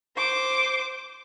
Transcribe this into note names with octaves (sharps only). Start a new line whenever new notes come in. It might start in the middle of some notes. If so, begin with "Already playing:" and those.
C5 D6